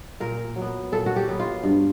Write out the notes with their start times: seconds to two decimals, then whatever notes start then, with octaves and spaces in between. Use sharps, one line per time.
0.20 A#2 A#4
0.56 F#3
0.61 B3
0.92 A#2 A4
1.06 F#4
1.16 G4
1.28 F#3 B3
1.40 F4
1.64 G2